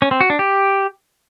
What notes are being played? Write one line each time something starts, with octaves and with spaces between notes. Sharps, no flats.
C#4
C4
F#4
D4
G4